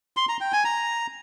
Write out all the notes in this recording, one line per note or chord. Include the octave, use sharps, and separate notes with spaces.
C6
A#5
G5
G#5
A#5